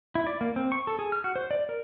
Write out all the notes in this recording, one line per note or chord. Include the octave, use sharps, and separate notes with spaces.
E4
D5
A#3
C4
C#6
A4
G#4
F6
F#4
C5
D5
A#4